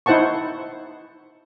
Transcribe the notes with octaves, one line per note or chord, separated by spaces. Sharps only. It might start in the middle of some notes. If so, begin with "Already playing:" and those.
D#4 E4 C5 F#5 A5 C#6